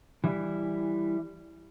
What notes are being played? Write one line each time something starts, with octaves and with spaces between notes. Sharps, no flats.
E3 G3 E4